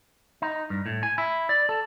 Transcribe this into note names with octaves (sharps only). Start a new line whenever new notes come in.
D#4
G2
A2
G#5
E4
D5
A4